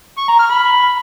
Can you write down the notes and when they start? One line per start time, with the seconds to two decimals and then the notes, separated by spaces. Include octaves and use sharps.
0.18 C#6
0.28 A#5
0.39 F6
0.50 B5